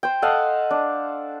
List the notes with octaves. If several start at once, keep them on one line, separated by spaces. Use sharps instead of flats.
C5 G5
A4 D#5 F5 F#5
D4